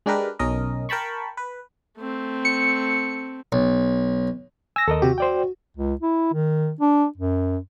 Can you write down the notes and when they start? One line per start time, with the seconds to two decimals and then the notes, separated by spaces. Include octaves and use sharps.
0.06 G#3 D4 G4 A#4 B4
0.39 B1 C#4 A#4 D#5
0.89 A#4 G5 A5 B5 C#6
1.37 B4
1.98 A3 C4
2.45 C#7
3.52 B1
4.76 G#5 E6 A#6
4.88 D#2 A4 A#4 D#5
5.02 C3 F#4 G4
5.18 C5 D5 G5
5.77 C#2
6.01 E4
6.33 D#3
6.81 D4
7.17 F#2